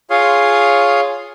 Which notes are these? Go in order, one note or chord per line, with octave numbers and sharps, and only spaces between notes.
F4 G#4 C#5 F5 C6 D#6